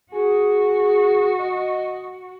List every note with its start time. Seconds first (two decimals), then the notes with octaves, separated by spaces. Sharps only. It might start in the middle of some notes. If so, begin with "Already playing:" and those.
0.12 F#4 G#4
1.39 D#5